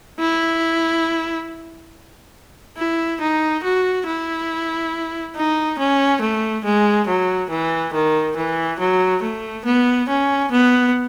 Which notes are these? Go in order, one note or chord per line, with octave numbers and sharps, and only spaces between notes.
E4
E4
D#4
F#4
E4
D#4
C#4
A3
G#3
F#3
E3
D#3
E3
F#3
A3
B3
C#4
B3